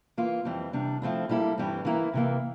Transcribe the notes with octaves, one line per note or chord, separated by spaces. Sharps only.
E3 A#3 F4
F2 E3 G3 C4
C3 G3 D4
F3 A3 C4 E4
G3 A#3 E4 A4
G2 E3 G3 C4
E3 A#3 E4 A#4
C3 E3 A#3